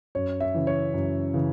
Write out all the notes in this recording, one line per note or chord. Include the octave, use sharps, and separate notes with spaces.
F#2 C#5
E5
C#3 E3
C#5
F#2
C#3 E3